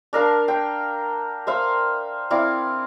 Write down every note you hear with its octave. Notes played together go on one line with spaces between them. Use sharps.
D4 A#4 F5 A5
G5
C5 E5 F5
C4 E4 D5 F5